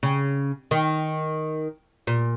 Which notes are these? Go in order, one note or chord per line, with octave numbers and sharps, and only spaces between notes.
C#3
D#3
A#2